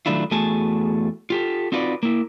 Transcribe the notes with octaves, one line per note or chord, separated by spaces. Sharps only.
D#3 F#3 A3 D4 E4 F4
E2 A3 F#4 G#4 G#5 A5
F4 G4 A4
C4 D#4 F4 F#4 B4 D5
A#3 E4